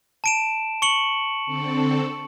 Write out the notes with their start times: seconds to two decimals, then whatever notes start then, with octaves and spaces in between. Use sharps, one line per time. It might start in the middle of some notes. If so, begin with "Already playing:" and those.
0.24 A5 D7 E7
0.82 C#6 C#7 F#7
1.46 D3 C4 A4